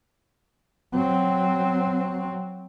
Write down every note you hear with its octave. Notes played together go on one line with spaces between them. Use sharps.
F#3 C4